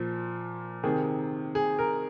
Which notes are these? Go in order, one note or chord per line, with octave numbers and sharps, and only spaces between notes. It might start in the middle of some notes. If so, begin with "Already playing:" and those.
Already playing: A#2 F3
C3 D#3 G#4
G#4
A#4